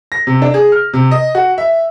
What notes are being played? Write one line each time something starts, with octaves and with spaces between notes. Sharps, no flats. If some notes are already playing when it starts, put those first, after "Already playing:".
A#6
C3
D4
G#4
F6
C3
D#5
F#4
E5